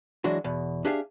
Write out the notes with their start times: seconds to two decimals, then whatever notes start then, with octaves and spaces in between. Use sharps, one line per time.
0.24 E3 F#3 G#3 D4 F#4
0.44 E2 B2
0.85 D4 G4 G#4 E5 F5